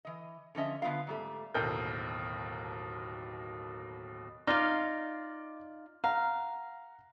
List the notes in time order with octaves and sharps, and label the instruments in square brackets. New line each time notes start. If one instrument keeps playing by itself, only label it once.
[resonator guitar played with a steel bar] E3 D#5
D3 F3 C#4 D#5 E5
D3 B3 C4 F4 F5
G#2 G3 A3
[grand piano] D1 D#2 B2 A4 A#4 G6
[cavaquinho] D#4 F4 F5 [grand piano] D5 D6 F6
[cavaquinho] F5 [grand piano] F#5 A#5